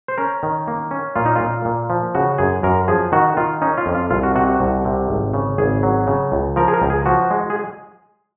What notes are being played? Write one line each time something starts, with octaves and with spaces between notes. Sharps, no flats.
C5
C#4 A#4
D#3
A#3
C#4
A#2 F4
D#4
A#2 F4
A#2
F3
C#3 F#4
F#2 G#4
F#2 A#4
F3 G#4
D#3 F#4
D#3 F4
C#4 D#4
F4
F2
F4
C2 F4
F#4
C3 F#4
F#4
C2
C3
G#1
C#3
G#1 G#4
F#3
C#3
C#2
F3 A#4
G#4
A#4
C#2
G#4
F3 F#4
G#3
G#4